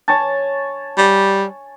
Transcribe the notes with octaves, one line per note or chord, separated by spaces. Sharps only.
C#5 G#5 A5
G3